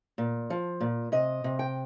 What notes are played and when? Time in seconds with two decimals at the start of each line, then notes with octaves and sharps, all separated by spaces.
0.18 A#2
0.50 F3
0.80 A#2
1.12 C3 D#5
1.44 C3
1.59 G5